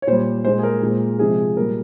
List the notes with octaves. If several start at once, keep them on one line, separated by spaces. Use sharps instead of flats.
C#5
A#2 G3 C5
A#2 G#3 C5
G#4
A#4
A#2 G#3
C3 F3 G#3 G#4
A#2 G3 A#4